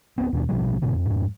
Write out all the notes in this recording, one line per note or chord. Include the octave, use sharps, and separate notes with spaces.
D1 E2 B3 C4
D#2 B2 C#4 D4
A#1 B2 F3 G3
G1 G#2 B2 D3
F2
F2 G#2